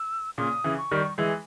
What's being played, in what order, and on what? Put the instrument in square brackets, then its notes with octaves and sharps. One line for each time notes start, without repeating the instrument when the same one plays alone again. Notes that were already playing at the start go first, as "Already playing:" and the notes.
Already playing: [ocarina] E6
[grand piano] A#2 C#3 [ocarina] D#6
[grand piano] C#3 E3
[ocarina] C#6
[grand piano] D#3 G3
[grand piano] E3 G#3 [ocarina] E6